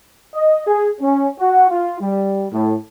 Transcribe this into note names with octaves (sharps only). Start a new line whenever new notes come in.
D#5
G#4
C#4
F#4
F4
G3
A2